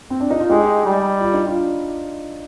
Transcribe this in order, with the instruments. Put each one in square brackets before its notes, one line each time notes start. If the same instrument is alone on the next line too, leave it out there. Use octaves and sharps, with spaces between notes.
[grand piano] C4
D4
D#4
F4
[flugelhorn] G#3 [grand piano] D#4 G4
[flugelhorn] G3
[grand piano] F4
D#4
D4 F4